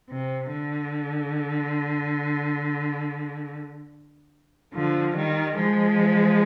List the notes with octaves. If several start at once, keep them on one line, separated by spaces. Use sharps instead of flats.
C3
D3
D3 F3
D#3 G3
F3 G#3